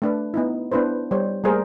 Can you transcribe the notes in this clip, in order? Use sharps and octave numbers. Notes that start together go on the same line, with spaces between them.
A3 D4 B4
B3 D#4 E4
B3 D4 E4 B4 C5
G3 C5 C#5
G3 A3 A#3 G#4 A#4 C5